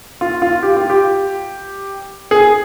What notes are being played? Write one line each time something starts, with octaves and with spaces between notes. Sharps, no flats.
F4
F4
G4
F4
G4
G#4